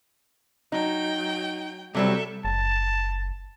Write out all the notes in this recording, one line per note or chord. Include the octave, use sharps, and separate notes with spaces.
F#3 D#4 G5
C3 F#3 G3 C4 A4 E5
F#1 A5